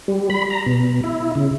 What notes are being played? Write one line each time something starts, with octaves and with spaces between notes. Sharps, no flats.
G3
B5
A#5
B2
E4
C#3